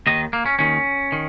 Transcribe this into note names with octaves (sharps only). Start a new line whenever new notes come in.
D#2 D#3 D#5
A#3
C#4
D#2 D#3 C#4
D#3